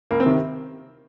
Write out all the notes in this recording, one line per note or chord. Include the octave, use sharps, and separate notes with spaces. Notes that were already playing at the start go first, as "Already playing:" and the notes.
C#2 A#3
C4
C3 D#3